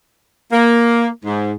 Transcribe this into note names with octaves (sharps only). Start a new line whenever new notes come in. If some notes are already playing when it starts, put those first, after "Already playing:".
A#3
G#2